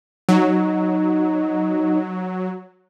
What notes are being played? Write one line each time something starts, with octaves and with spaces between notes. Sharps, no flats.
F#3 D#4